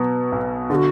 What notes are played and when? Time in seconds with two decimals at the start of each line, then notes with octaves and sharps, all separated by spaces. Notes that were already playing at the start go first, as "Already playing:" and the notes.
Already playing: B2 F#3 B3
0.32 B1
0.70 D3 G#4
0.75 F#4